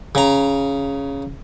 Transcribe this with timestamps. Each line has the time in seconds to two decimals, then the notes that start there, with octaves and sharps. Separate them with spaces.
0.15 C#3 A#5